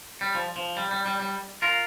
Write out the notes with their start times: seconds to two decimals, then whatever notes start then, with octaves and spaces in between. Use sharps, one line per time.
0.21 G3
0.35 F3
0.56 F3
0.77 G3
0.91 G3
1.06 G3
1.20 G3
1.62 F4 A#4